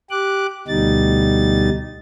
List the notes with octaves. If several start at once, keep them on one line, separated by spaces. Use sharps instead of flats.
G4 D6 F#6
D2 B2 G3 D#4 A6